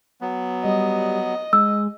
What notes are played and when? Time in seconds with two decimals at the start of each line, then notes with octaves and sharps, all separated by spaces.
0.21 F#3 B3
0.65 G3 D#5
1.53 G#3 E6